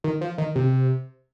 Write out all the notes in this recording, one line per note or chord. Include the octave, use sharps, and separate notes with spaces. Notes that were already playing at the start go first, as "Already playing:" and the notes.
D#3
F3
D#3
C3